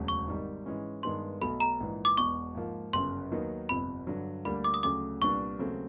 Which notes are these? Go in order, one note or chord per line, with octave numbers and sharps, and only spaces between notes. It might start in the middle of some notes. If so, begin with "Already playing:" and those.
Already playing: E1 D2 C#3 F#3
C#6
G#1 G#2 D#3 G3
G#2 E3 G#3 C#4
G2 D#3 G#3 B3 C6
B1 B2 F#3 A3 B5
A#5
A#1 G#2 E3
D6
E1 E2 B2 C#6
G#2 F3 A#3
G1 F#2 C#3 C6
D#2 D#3 F#3 B3 D#4
G1 F2 C3 B5
G2 D3 F#3
D2 D3 G3 A#3 D4 B5
D6
D#6
D2 C#3 F#3 A3 C#4 D6
C2 A#2 G3 B3 D4 C#6
D#2 C#3 F#3 A3 C4